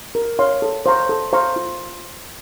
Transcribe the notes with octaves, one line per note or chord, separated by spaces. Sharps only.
A#4
C#5 F5 C6
A4
C5 F5 A#5 C#6
A4
C5 F5 A#5 C#6
F4